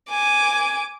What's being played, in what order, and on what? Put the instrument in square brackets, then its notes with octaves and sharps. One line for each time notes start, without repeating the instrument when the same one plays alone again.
[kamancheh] G#5 [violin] D6